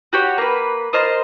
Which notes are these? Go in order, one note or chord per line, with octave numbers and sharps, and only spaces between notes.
F#4 G4 C#5
A#3 B4
F4 A#4 C5 D#5